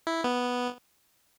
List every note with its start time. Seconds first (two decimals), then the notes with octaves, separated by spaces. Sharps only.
0.07 E4
0.24 B3